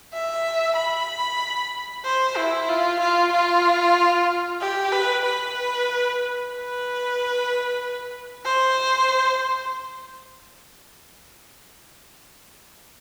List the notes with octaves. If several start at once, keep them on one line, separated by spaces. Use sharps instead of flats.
E5
B5
C5
E4
F4
F4
F4
G4
B4
B4
B4
C5